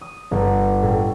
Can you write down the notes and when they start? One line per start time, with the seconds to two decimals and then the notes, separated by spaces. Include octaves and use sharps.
0.01 D#6
0.31 G1
0.83 A2